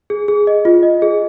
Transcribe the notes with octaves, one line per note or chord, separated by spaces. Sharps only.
G#4
G#4
D#5
F4
D#5
G#4